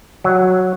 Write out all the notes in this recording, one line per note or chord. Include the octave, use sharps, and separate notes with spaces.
F#3